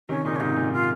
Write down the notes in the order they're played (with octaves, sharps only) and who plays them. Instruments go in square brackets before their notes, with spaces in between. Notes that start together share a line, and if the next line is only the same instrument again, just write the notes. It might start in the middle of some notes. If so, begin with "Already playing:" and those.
[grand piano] C3 D#3 [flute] C#4
[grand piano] A#2 C#3 [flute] D#4
[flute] C#4
[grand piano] G#2 C3 [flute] D#4
[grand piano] A#2
[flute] F4